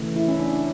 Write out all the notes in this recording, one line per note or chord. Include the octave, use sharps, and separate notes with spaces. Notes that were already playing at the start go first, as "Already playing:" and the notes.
Already playing: C#3 E3 A3
E4
C#4
D4